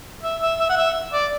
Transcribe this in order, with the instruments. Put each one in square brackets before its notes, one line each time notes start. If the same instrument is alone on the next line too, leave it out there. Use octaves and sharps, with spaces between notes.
[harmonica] E5
E5
E5
F#5
E5
D5